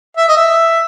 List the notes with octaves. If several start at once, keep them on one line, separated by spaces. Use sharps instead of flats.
E5
D#5
E5